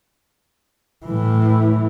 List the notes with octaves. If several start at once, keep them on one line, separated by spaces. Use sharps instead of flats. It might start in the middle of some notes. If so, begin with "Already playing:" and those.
A2 E3